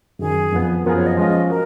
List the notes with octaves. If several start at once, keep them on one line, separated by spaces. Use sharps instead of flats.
F#2 D#3 F#3 G#4
F2 F3 B3
F#2 F3 B3 F4 G#4 A#4
C#5
D#5
F3 G#3 C#4 F4 D#5
F#4 A#4